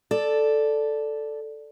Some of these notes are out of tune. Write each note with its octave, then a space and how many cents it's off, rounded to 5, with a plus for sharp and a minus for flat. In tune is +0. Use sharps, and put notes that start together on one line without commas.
A4 +0 D5 +0